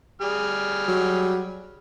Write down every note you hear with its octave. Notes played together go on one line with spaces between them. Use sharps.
G3 G#4 F6
F#3